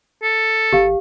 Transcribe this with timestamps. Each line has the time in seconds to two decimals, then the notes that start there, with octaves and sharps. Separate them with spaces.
0.23 A4
0.73 G#1 G4 F5